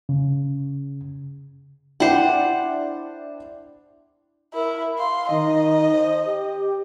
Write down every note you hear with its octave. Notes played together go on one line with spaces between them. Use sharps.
C#3
D4 E4 C5 F#5 G5
E4 A#4
F5 C6
D#3 D#5
C5
G4